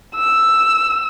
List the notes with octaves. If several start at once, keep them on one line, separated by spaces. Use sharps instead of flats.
E6